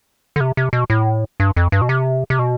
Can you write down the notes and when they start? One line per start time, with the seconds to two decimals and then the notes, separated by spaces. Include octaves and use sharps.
0.36 D3
0.40 C3
0.57 C3
0.73 B2
0.90 A2
1.40 G2
1.56 F2
1.72 G2
1.81 B2
1.89 C3
2.30 C3
2.39 B2